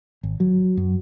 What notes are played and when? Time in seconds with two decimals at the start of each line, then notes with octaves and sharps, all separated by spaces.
0.23 G#1
0.40 F#3
0.77 F#2